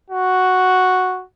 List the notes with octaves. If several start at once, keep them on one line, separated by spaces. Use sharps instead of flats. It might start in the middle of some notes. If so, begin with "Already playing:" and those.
F#4